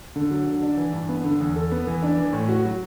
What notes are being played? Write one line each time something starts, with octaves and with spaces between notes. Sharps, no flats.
D3
F#3
D3
D4
E3
G2
B3
D3
E2
A4
B3
E3
D4
E3
A2
F#4
F#3